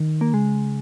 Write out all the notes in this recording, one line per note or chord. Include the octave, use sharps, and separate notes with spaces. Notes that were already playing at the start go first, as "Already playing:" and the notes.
Already playing: D#3
A#3
C#3 G#3